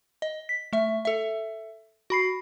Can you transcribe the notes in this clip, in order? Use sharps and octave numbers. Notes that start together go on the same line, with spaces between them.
D#5
B6
A3 E5
A4 E5
F#4 B5 C7